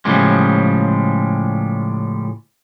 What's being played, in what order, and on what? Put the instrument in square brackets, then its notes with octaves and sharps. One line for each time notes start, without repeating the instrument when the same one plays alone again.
[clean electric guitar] A2 C#3 F3 G3 G#3